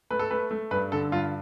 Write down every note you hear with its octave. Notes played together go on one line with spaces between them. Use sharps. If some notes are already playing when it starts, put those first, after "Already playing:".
A3 B4
A4
A3 B4
A3
G2 B4
D3 A4
G2 F4